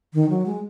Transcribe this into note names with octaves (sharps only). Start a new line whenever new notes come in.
D#3
F#3
G#3